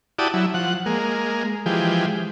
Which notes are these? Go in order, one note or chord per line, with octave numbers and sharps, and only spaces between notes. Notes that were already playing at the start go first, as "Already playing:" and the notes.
E4 F#4 G4 D5 A5 D#6
F#3 E4
F3 F#5
G#3 A#3
E3 F3 G#3 G4